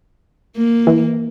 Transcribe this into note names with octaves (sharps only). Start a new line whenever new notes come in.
A#3
E3